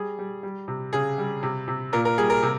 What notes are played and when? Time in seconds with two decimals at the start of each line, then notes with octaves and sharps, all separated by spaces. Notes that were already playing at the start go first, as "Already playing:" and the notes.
Already playing: G3 G#4
0.19 G3
0.43 G3
0.68 C3
0.93 C#3 G#4
1.18 G3
1.43 C3
1.68 C3
1.93 A#2 A#4
2.05 A#4
2.18 G3 G#4
2.30 A#4
2.43 C3